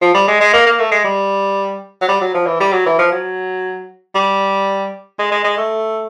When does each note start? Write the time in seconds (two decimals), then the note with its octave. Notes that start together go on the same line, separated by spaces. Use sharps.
0.01 F3
0.15 G3
0.28 G#3
0.40 G#3
0.54 A#3
0.66 A#3
0.79 A3
0.92 G#3
1.05 G3
2.01 F#3
2.08 G3
2.21 F#3
2.34 F3
2.47 E3
2.60 G3
2.73 F#3
2.86 E3
2.99 F3
3.12 F#3
4.15 G3
5.19 G#3
5.32 G#3
5.44 G#3
5.57 A3